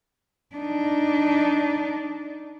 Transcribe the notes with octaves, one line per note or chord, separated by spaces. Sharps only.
D4 D#4